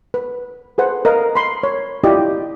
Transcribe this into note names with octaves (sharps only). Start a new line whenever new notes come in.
B4
G#4 A4 B4 C5 F#5
A#4 B4 D#5 F5
B5 C6
C#5
E4 F4 G4 D5 D#5